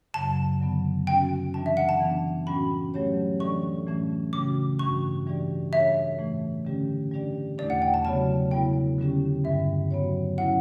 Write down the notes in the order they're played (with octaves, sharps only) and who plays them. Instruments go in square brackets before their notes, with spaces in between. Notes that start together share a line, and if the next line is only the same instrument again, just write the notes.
[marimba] F#2 C#3 F#3 [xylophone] A5
[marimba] D3 F#3 B3
[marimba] G3 C#4 F#4 [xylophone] G5
[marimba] E3 G3 D4 [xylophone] A5
[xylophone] E5
F#5
A5
[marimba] E3 B3 D4
[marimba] A2 G3 C#4 F#4 [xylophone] B5
[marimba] F#3 A3 C#4 G4 C#5
[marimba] E3 G3 D4 A4 D5 [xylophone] C#6
[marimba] A2 E3 A3 C#4
[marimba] C#3 G3 C#4 F#4 [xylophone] D6
[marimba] G2 E3 G3 D4 F#4 [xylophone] C#6
[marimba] E3 G3 D4 G4 D5
[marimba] G3 D4 A4 C#5 [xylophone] E5
[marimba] A2 E3 A3
D3 G3 C#4 G4
G3 D4 G4 D5
[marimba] E2 B2 A3 D4 [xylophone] D5
[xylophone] F#5
G5
A5
[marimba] C#3 F#3 B3 F#4 C#5 [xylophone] A5
[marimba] C#3 G3 B3 E4 A4 [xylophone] G5
[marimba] D3 G3 C#4 G4
[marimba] G2 D3 G3 [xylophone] E5
[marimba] F#3 B3 F#4 C#5
[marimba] F#3 C#4 E4 [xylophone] F#5